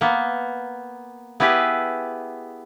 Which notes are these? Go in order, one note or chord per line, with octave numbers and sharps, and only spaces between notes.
A#3 B3
B3 E4 G4 G#4 B4